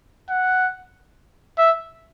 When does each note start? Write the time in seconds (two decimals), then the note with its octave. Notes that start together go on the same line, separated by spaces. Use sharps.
0.29 F#5
1.58 E5